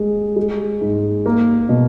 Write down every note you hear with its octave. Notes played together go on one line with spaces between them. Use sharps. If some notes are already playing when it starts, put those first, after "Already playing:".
Already playing: G#3
G#3
G#2
A#3
B2